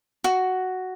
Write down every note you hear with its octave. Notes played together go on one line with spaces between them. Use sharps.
F#4